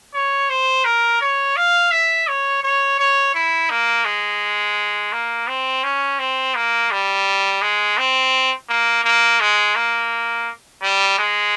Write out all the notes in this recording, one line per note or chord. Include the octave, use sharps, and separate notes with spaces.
C#5
C5
A#4
C#5
F5
E5
C#5
C#5
C#5
E4
A#3
G#3
A#3
C4
C#4
C4
A#3
G3
G#3
C4
A#3
A#3
G#3
A#3
G3
G#3